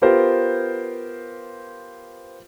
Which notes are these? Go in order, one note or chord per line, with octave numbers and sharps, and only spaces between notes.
B3 F4 G4 A#4 C5